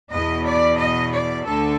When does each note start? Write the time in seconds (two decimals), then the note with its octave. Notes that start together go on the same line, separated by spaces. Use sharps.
0.11 E2 B2 D#5
0.45 D5
0.78 D#5
1.12 D5
1.45 D2 D3 A4